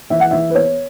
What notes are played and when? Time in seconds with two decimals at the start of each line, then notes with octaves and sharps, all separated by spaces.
0.10 E3 E5
0.20 F#5
0.31 E3 E5
0.50 B4
0.55 B3 C#5